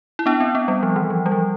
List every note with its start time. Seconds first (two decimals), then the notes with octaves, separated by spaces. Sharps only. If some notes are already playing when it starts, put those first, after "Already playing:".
0.19 E4
0.26 B3 D4
0.40 C4
0.55 B3
0.68 G3
0.83 F3
0.96 E3
1.10 F3
1.26 G3
1.32 F3